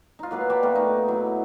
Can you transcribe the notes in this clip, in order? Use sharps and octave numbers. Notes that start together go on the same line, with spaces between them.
D#4 F4
F#3 A#3 B4 F5
D5 G5 A5 B5
B2 A3 A#3
D#4
F#3 E4